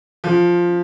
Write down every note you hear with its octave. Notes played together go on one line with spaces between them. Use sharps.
F3